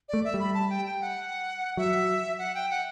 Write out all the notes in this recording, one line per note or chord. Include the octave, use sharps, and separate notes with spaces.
A3 D5
E5
G3
B5
A5
G5
G5
F#5
F#3 E5
F#5
G5
F#5